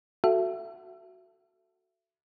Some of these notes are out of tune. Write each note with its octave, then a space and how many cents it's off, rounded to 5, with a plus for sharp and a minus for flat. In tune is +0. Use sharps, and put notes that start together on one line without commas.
F#4 +0 A4 +0 E5 +30